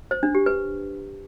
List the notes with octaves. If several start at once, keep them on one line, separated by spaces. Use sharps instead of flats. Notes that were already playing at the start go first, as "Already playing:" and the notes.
C5
D4
G4
B4